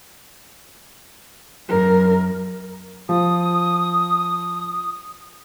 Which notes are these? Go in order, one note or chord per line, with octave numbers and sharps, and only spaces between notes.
F#2 A#4
F3 D#6